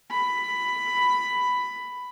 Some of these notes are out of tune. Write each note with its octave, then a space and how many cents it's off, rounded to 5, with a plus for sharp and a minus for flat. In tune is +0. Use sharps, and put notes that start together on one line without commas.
B5 +10